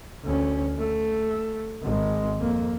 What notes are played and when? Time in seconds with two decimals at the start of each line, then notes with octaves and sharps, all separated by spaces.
0.24 D2 C#4
0.78 A3
1.83 G#1 G#3
2.40 F2 A#3